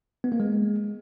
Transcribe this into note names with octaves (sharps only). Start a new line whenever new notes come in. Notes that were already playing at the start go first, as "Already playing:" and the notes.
B3
A#3
G#3